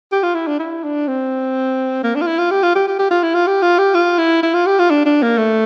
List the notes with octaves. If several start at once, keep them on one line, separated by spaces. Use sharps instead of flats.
G4
F4
E4
D4
E4
D4
C4
A#3
D4
F4
E4
F4
G4
F4
G4
G4
G4
F4
E4
F4
G4
F4
G4
F4
E4
E4
F4
G4
F4
D4
D4
A#3
A3